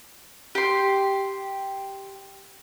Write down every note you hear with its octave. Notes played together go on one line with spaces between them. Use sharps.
G4 C6